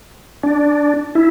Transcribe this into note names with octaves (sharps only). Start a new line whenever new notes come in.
D4
E4